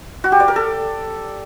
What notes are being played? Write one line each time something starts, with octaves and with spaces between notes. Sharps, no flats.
F#4
G4
D5
A#4
A4